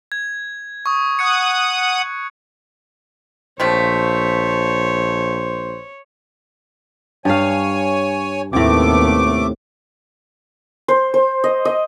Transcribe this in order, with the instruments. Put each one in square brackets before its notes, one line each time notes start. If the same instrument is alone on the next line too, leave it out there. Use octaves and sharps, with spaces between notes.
[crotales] G#6
C#6 D#6
[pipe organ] F#5 D#6 [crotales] F#6 G#6 C#7
[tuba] A#1 [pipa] C3 F3 A3 [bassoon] C5 [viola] C#5
[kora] G2 F5 [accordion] C#5 G#5
[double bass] D#2 B3 [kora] A2 C3 [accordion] A3 D6
[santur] C5
C5
D#5
D#5